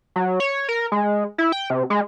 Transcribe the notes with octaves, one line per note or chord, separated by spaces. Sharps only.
F#3
C#5
A#4
G#3
E4
G5
C3
G#3